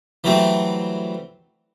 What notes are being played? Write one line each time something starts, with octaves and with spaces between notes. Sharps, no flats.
E3 F#3 G3 A3 C4